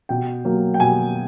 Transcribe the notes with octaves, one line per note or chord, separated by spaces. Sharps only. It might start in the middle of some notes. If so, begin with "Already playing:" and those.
B2 G5
F#3 A#3
G5
B2 G#5